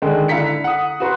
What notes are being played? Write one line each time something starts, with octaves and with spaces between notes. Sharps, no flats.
D3 D#3 G#3
D3 E4 F5 A#5 B6 C#7
F#5 D#6
F#4 B4 A#5 C6